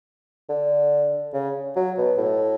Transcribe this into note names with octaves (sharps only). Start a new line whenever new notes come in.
D3
C#3
F#3
B2
A2